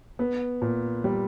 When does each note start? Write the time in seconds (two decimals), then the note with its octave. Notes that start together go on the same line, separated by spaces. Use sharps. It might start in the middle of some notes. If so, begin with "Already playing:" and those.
0.19 B3
0.62 A#2
1.04 G3